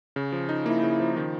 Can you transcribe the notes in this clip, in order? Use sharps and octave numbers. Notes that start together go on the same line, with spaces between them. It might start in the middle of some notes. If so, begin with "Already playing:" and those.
C#3
F3
D#4
A#3 E4
C#3
F3
D#3